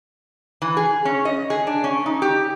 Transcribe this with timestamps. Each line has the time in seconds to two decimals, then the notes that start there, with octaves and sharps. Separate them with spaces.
0.62 E3
0.77 G#4
1.05 C#4
1.25 D#5
1.50 G#4
1.67 D4
1.84 C#4
2.06 D#4
2.22 G4